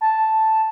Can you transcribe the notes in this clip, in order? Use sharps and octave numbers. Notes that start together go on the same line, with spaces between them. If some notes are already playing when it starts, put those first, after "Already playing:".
A5